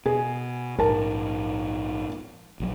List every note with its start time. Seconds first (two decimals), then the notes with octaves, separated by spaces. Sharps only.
0.06 B2 G#4
0.79 A#1 G#2 A#4 A5
2.60 A#1 F#3